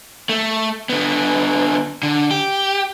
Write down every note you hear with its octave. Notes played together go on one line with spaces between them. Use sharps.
A3
D3 B3
D3
G4